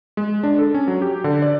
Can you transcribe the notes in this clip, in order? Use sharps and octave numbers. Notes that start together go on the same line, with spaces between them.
G#3
D4
A4
C#4
F#3
G4
D3
D5